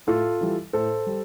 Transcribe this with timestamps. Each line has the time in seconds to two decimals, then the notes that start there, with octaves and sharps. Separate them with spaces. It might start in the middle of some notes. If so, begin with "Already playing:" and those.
0.07 A2 F4 A4
0.41 E3 G3
0.73 A2 A4 C5
1.06 G3